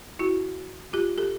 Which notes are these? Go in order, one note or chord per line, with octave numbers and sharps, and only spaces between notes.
E4 F#4
F4 G4
G4 A4